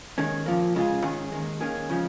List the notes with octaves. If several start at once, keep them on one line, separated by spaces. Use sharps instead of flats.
D#2 D#3 G#3 C#4
A#2 F3 A#3
C#2 C#3 G#3 F4 G#4
G#2 D#3 C#4 G#4
D#2 D#3 G#3
D#3 A#3 C#4 G#4
C#3 F3 G#3 C#4